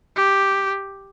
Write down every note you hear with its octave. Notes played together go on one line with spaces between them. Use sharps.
G4